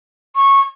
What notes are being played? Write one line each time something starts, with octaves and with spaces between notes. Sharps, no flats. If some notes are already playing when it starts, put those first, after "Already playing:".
C#6